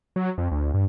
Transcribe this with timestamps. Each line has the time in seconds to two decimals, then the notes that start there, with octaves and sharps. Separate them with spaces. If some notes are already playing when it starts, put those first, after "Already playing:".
0.16 F#3
0.38 F2
0.52 D2
0.74 G2